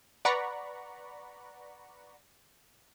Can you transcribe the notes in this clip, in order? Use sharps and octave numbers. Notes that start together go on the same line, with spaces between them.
B4 D5 F#5 A#5 B5 C#6